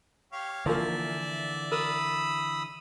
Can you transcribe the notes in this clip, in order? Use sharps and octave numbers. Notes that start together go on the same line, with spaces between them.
G4 C#5 F5
D3 E3 F3 A#3 D5 E5
A#4 B5 D#6 E6